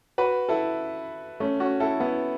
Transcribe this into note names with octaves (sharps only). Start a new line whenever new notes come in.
F#4 B4
E4 A4
A3 C#4
C#4 F#4
E4 A4
B3 E4